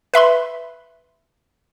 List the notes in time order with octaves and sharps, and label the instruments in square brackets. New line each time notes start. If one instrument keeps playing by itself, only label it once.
[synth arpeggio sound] B4 E5 B5 C6